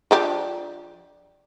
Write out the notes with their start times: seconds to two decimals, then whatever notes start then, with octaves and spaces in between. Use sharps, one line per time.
0.11 F3 D4 G4